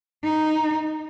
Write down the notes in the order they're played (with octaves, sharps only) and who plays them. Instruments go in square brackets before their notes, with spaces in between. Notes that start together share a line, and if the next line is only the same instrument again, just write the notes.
[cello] D#4